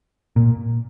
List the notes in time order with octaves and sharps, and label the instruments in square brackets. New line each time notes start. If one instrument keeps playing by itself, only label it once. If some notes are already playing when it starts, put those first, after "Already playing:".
[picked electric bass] A#2